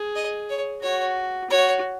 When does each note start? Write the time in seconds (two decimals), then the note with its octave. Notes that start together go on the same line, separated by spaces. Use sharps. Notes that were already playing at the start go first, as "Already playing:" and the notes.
Already playing: G#4
0.16 D#5
0.50 C#5
0.82 F#4 C#5
1.50 F#4 C#5